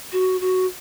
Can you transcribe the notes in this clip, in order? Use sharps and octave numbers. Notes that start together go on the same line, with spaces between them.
F#4
F#4